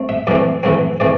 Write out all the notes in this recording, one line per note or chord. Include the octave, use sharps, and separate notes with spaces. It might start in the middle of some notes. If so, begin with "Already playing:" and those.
Already playing: A3 C4
E5
F2 E3 A3 C4 D5
F2 E3 A3 C4
E3 A3 C4 D5